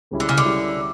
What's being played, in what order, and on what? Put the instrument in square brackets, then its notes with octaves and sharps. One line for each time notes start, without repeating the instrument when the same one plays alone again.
[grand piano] C#2 C#3 G3 C#4 E4
[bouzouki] D3
C#3
D3
[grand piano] G3 C#4 E4